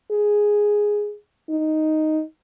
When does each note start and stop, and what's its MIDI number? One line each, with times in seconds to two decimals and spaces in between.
0.12 1.15 68
1.50 2.22 63